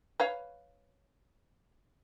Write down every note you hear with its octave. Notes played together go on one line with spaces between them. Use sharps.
B4 C#5 F5